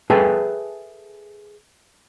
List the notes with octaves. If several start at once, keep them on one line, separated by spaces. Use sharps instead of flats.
G#4 A4 B4 E5 G5 A5